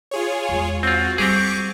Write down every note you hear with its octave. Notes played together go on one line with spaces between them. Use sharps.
F4 G#4 C#5
E2 G#3
C4 F4 F#4
G3 C4 G4 G#4 C#6 D6